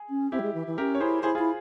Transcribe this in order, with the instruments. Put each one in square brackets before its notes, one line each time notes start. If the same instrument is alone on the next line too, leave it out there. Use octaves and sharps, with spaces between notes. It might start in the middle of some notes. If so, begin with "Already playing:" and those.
Already playing: [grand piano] G#4
[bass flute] C#4
[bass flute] C4 [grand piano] E4 G4
[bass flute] G3
G#3
E3
E3
[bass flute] C#4 [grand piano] G4 A#4
[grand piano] C#5
[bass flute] E4 [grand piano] G#4 C5
[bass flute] E4 [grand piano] G#4 C5
[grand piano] F4 G#4
[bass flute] E4